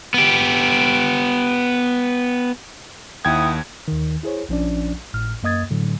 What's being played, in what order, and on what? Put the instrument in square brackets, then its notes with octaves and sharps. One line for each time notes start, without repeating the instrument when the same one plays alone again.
[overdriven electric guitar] B3 G4
[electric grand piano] D#2 G5 G#6 [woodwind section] E4 F#5 D#6
[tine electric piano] D#2 D#3
E4 G#4 C5 C#5
A#1 F3 C#4 D4 D5
G#1 A2 F6
F#2 A#3 D#5 D#6 G#6 A6
A2 D3 F#3